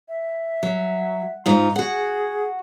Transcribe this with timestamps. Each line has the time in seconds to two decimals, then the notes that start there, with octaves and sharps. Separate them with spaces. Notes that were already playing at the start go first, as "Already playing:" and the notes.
0.09 E5
0.63 F#3
1.46 G#2 D#4 F4 A#5
1.76 F#4 G#4 F#5